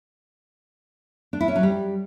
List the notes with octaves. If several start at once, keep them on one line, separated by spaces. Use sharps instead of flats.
D4
E4
C#4
F#3
G3